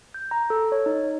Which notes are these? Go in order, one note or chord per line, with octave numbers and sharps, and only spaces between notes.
G6
A#5
A4
C#5
D#4